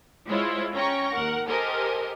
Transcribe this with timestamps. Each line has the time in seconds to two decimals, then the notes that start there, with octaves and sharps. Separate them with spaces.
0.29 G#3 E4 F4 C5 C#5
0.74 C#4 G5 A#5 C#6 A#6
1.13 D#2 A#4 F#5
1.48 G4 A4 A#4 C5 D#5 G#5